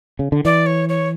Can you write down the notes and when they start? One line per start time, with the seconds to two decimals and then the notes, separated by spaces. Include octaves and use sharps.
0.19 C#3
0.32 D3
0.45 E3 D5
0.66 C#5
0.89 C#5